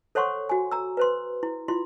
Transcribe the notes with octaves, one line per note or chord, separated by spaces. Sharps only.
A4 C5 C#5 F#5 C6 C#6
F#4 G#5
A#5 E6
B4 C5 C6
E4
E4 F4 C6